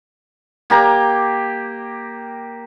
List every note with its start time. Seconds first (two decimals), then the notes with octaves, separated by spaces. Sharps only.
0.70 A#3 G4 A#5